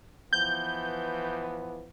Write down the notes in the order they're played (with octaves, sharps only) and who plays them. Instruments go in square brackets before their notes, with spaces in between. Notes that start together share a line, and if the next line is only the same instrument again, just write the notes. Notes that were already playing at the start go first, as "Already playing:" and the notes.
[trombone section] E3 F3 B3 [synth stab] G6